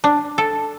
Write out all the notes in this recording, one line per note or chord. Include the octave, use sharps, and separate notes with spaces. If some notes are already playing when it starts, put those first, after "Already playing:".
D4
A4